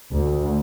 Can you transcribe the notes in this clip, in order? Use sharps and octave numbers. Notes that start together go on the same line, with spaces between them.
D2